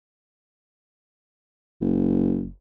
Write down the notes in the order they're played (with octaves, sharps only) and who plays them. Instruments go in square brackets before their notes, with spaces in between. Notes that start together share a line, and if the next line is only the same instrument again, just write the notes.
[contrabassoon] F#1